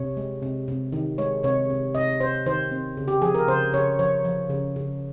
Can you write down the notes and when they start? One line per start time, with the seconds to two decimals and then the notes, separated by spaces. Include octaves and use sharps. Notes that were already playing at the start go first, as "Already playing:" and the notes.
Already playing: C3 C#5
0.17 G#3
0.42 C3
0.68 C3
0.93 D#3
1.18 G#3 C#5
1.43 C3 C#5
1.70 C3
1.95 C3 D#5
2.20 C3 C5
2.46 D#3 C5
2.71 C4
2.97 C#3
3.08 G4
3.22 F3 G#4
3.35 A#4
3.47 C#3 C5
3.73 C#3 C#5
3.99 F3 C#5
4.25 F3
4.50 C#3
4.76 C#3